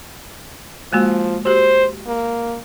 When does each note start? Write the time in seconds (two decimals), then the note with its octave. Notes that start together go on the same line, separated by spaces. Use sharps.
0.93 F3 G#3 A#3 F#4
1.46 F#4 G4 C5
2.07 A#3